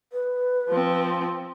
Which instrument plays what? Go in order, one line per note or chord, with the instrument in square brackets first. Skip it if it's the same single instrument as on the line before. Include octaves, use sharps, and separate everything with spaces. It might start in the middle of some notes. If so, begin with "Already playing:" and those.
[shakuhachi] B4
[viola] F3 C4